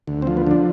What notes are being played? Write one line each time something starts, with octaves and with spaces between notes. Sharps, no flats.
D2
C4
F3
B3
D3 D4